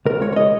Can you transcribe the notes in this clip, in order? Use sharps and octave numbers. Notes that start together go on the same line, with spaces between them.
C#2 A#4
G#3 C#5
C#5
C#3 D#5